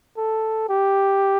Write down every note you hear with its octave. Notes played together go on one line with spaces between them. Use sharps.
A4
G4